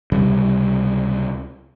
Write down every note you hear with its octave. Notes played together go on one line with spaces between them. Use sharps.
C#2 C3 G3